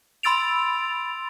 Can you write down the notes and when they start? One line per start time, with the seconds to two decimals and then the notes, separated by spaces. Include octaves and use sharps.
0.23 B5 C6 E6 A6 D7 F7